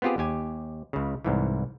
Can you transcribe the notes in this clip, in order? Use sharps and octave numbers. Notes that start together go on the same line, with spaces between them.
B3 C4 F4 G4 G#4
D#2 G4 G#5
C#2 C#3
C2 G#2 E3